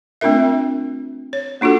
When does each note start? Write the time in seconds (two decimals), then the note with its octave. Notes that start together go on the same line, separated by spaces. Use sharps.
0.21 A3 C4 D4 F4 A#4 E5
1.33 C#5
1.61 A#3 D4 F4 F#4 A4